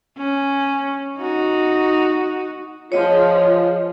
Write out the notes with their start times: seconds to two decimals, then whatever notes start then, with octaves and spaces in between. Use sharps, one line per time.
0.18 C#4
1.19 D#4 F#4
2.92 F3 F4 G#4 C#5 D#5